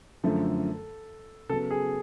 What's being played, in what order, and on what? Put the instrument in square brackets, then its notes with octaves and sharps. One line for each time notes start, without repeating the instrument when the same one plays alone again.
[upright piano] F#2 D3 F3 A3 [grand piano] A4
[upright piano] C#3 F#3 B3 [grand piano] A4
[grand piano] G#4